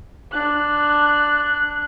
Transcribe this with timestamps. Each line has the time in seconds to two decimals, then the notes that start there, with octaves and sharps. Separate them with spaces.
0.32 D4 F#6